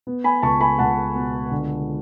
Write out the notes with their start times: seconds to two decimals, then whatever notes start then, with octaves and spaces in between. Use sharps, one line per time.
0.07 B3
0.24 G#5 B5
0.42 C#2 A5 C#6
0.61 G#5 B5
0.79 C#2 F#5 A5
1.15 B2
1.51 D3